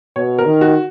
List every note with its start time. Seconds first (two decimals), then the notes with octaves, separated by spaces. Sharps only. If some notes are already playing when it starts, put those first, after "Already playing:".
0.16 B2 C#5
0.38 A#4
0.46 D#3
0.61 F#4